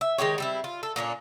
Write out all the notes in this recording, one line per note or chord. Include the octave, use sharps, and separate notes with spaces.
E5
D#3 G#3 G4 C#5
G3 C4 E4
F4
A4
A#2 A#3 C#4 D4